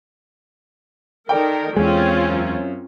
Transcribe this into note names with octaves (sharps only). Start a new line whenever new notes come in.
D#3 A4 A#4 D5 G5
E2 G#3 C4 C#4 F4
F#2